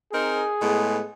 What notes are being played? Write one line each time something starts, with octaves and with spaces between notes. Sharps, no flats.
C4 D#4 G#4 A#4
A2 G#3 B3